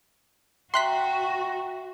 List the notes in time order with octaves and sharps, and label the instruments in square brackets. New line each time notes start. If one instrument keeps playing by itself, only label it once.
[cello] F#4 [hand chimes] E5 G5 A#5 [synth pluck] C6 F#6 B6